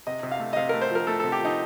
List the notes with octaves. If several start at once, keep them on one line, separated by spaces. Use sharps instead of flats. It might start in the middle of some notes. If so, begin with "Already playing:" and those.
C3 D#5
C3
F5
A3
D#5
C3 F5
A3 A#4
C5
F3 A#4
A3 A4
C3 A4
G4
F3 D#4